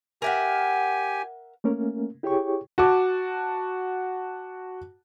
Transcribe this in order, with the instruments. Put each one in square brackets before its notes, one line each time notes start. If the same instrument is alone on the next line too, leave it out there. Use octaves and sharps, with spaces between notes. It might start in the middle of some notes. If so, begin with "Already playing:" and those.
[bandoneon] G4 G#5 [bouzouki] A#4 E5 F#5
[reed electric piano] A3 A#3 C#4 A#4
E4 G4 G#4 C#5 G5 C#6
[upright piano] F#4 A5 D6